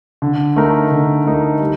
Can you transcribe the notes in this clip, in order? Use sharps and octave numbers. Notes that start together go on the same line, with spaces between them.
D3
A3 D#4 A#4
D3
A3 D#4 A#4
G3